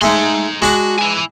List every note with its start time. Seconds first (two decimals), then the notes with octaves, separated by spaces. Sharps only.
0.02 G#3 A3 D#4 C6
0.62 G#3 D4 F#4 A5
0.98 E4 G#5